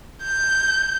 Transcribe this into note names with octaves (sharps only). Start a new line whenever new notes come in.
G6